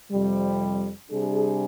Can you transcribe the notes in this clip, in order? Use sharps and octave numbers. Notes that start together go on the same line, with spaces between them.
F2 C3 G3
C3 G3 D4 G#4